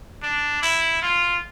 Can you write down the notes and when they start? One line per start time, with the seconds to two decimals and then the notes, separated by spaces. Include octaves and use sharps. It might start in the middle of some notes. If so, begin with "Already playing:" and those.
0.22 D4
0.62 E4
1.02 F4